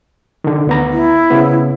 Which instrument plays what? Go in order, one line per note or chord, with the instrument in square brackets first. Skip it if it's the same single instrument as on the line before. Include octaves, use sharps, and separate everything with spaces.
[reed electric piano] D3 D#3
D2 B3 A#5
[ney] E4
[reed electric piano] C#3 B3